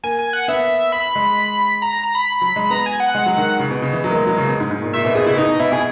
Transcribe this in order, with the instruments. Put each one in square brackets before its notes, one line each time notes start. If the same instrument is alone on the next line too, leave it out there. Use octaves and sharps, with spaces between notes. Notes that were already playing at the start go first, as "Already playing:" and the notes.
[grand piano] A#3 [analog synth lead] G#5
[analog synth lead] G#5
F#5
[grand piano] B3 [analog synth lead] E5
[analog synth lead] B5
[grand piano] G#3
[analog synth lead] A#5
A#5
A#5
B5
[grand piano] F#3
G#3
[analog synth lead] B5
[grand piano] B3 [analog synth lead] A#5
[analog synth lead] G#5
F#5
[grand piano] G#3
F#3
D#3
C#3
B2
C#3
E3
F#3
A#3
G#3
F#3
C#3
B2
G#2
G#2
A#2
[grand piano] A#2 [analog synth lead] E5
[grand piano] B2 [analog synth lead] E5
[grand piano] B2 [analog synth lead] G#4
[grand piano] C#3 [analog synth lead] E4
[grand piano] B2 [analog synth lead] D#4
[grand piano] B2
[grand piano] B2 [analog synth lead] E4
[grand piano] B2 [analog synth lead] G#4